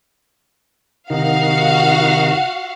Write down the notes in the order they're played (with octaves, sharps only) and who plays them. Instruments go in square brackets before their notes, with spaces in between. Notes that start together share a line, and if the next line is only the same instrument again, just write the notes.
[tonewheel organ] C3 D#3 D#4 [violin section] F#4 F5 F#5